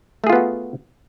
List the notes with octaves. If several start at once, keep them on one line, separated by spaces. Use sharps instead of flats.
A3 B3 F4 F#4 G#4